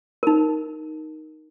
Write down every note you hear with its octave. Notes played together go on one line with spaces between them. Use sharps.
D#4 A#4